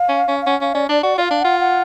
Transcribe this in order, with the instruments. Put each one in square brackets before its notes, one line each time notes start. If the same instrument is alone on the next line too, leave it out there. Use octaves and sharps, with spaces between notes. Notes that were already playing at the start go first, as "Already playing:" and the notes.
Already playing: [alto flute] F5
[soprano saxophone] C#4
C#4
[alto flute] F5
[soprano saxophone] C#4 [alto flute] F#5
[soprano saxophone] C#4 [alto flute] F5
[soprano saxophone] C#4 [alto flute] D5
[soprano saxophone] D4 [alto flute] D5
[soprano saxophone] F#4 [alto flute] D5
[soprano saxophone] F4 [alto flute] D5 F5
[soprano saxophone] D4
[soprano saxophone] F4 [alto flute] F#5
[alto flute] F#5